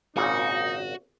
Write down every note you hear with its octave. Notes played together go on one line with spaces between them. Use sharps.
G#1 A#2 C#3 D#4 F#4